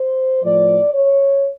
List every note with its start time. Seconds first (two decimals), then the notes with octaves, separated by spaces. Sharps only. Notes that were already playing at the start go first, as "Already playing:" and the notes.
Already playing: C5
0.43 A2 F3 D5
0.93 C#5